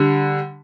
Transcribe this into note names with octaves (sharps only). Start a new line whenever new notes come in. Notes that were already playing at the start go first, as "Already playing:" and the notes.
Already playing: D3 G3